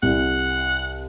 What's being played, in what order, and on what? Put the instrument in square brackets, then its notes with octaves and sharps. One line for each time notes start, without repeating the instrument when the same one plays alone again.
[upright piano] C2 [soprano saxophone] F#5